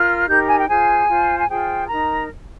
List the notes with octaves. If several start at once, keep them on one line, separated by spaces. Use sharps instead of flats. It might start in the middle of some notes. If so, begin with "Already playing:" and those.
Already playing: F4 A#4 F6
D#4 G4 A#4 G6
G#5
G5
F4 G#4 C5 G#5
F4 C5
G#5
F4 G#4 C5 G5
D#4 A#4 A#5